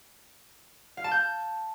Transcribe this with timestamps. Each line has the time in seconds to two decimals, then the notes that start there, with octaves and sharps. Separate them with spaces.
0.97 F5
1.04 A5
1.11 G6